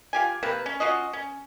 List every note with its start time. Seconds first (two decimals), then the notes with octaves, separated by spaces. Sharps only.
0.13 F4 G4 G#5
0.43 C3 A#3 B4
0.66 C#4
0.80 C#4 F4 F#4 D#5
1.13 C#4